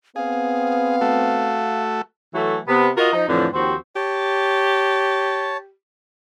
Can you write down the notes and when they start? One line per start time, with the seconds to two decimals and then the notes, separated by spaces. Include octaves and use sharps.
0.16 B3 C4 G#4 F5
1.01 A3 F#4 A4
2.34 E3 F#3 A3
2.68 C3 B3
2.97 F4 F#4 A#4 D#5
3.13 F3 D#4
3.29 F2 A2 D3 E3 F3
3.54 D#2 F3 C4 F#4 G4
3.96 G4 C#5 A5